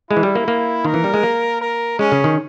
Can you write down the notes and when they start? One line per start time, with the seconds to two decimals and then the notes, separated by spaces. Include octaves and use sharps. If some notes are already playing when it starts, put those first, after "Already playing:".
0.10 G#3 E4
0.17 E3
0.23 G3
0.35 A#3
0.48 A#3
0.85 D#3 A#4
0.94 E3
1.04 G3
1.14 G#3
1.23 A#3
1.61 A#4
1.99 G#3 C#4
2.12 C#3
2.24 D#3